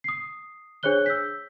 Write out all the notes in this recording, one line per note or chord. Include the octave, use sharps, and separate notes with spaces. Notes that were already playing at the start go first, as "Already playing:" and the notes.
D#6 C7
D4 G#4 C5 C#5 F#6 G7
E6 G6 B6